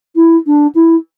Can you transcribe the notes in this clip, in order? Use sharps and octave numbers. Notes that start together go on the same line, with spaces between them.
E4
D4
E4